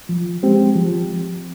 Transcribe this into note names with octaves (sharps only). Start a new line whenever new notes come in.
F3
G#3 C4 G4
F3